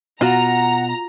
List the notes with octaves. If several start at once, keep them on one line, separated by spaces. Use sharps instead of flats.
B2 F4 F#4 F#5 A#5